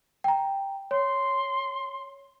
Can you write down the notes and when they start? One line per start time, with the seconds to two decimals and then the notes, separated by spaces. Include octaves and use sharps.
0.24 G5 A#5
0.91 C#5 C6